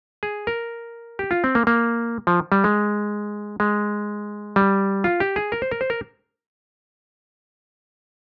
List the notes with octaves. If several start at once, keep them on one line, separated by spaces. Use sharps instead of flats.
G#4
A#4
G4
F4
C4
A#3
A#3
F3
G3
G#3
G#3
G3
F4
G4
G#4
A#4
C5
A#4
C5
A#4